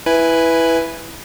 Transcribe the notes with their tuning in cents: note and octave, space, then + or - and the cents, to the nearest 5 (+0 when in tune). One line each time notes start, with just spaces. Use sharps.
E4 +0 B4 +0 G#5 +0